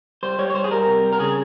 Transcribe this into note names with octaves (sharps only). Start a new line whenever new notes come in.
G3 C5
G3 C#5
C#5
G3 C5
G#4
G3 A#4
C3
G3
A#4
C#3 G#4